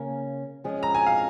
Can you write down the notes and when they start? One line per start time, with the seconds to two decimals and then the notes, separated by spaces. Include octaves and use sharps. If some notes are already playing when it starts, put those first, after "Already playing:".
Already playing: C#3 A#3 C#4 A#4
0.64 F3 G#3 C#4 G#4
0.83 A#5
0.95 G#5
1.06 F5